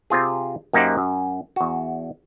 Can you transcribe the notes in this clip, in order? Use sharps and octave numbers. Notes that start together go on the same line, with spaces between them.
C3 C4 F4 G#4
F#2 A#3 D#4 G4 C5 F#5
F#2
E2 F#4